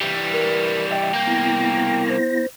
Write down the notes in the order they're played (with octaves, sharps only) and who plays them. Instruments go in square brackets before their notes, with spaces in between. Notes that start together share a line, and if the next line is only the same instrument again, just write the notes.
[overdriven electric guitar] E3 G3
[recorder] A#4
[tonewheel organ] D#5 E5 [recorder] G5
[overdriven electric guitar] C2 A#3 [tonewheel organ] G6
[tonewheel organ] B3 E4 A#6
[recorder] C5